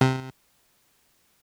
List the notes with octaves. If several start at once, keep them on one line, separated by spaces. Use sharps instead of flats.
C3